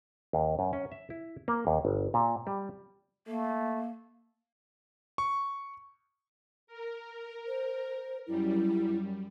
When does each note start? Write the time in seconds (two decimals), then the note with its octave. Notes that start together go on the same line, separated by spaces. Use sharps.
0.33 D#2
0.59 F#2
0.73 C#4
0.92 E5
1.10 E4
1.48 A#3
1.67 D#2
1.85 G1
2.14 A#2
2.47 G3
3.27 A3 A#3
5.18 C#6
6.67 A#4
7.47 C5
8.27 F#2 G3 E4